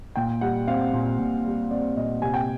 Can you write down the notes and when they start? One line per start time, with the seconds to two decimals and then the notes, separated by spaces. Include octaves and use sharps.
0.16 A#2 G5
0.41 G3 F#5
0.67 C4 F5
0.93 A#2
1.19 A#2
1.45 G3
1.71 C4 D5
1.96 A#2 D#5
2.22 C3 G#5
2.34 G5